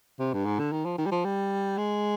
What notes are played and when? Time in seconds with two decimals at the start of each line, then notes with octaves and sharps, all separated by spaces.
0.19 C3
0.33 G2
0.46 G#2
0.59 D3
0.72 D#3
0.85 F3
0.98 D#3
1.06 G3
1.11 F3
1.25 G3
1.78 G#3